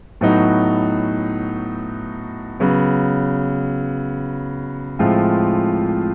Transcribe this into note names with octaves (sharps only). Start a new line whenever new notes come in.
A2 F#3 B3 D#4 F#4
C#3 F#3 B3
A2 F3 G#3 C4 F4